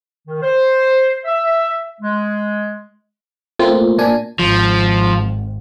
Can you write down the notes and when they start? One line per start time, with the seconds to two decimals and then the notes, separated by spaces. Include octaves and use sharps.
0.28 D#3
0.42 C5
1.24 E5
2.00 G#3
3.59 A3 A#3 C4 F4
3.98 A#2 D4 G#5
4.39 G#1 F3